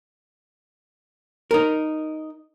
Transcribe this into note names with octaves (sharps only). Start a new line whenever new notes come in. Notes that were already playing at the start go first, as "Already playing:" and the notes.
D#4 A#4